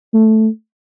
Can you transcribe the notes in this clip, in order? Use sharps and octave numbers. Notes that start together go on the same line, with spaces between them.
A3